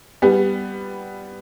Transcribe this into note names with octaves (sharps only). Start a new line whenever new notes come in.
G3 B3